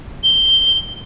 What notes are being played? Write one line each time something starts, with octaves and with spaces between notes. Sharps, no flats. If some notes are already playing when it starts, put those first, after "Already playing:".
G7